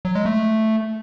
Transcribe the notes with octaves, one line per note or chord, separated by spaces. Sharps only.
F#3
G#3
A3